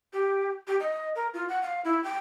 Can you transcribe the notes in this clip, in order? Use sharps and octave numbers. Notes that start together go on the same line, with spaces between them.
G4
G4
D#5
A#4
F4
F#5
F5
E4
G5